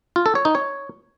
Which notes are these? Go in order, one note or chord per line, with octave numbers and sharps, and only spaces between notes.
F4
A4
C#5
D#4
C#5